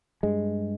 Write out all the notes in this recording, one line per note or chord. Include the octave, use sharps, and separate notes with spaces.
G2 G#3